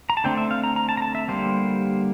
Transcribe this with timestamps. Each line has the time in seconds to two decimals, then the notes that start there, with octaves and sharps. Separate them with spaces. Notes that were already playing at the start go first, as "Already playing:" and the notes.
0.10 A#5
0.17 A5
0.24 D3 A3 C4 G5
0.37 E5
0.51 F5
0.64 A#5
0.76 A#5
0.89 A5
0.97 A#5
1.02 A5
1.15 E5
1.28 D3 G3 A#3 C5